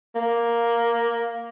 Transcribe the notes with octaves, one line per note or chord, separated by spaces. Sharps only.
A#3